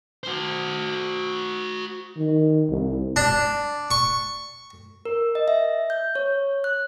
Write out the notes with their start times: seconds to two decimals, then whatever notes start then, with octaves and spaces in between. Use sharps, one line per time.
0.24 F#4 C5
2.17 D#3
2.69 C2
3.16 D4
3.91 C#6
5.05 A#4
5.35 D#5
5.48 E5
5.90 G6
6.15 C#5
6.64 F#6